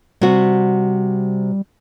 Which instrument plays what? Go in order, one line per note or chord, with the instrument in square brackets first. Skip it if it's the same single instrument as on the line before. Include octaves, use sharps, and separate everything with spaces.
[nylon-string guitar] C3 F#4 [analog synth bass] G3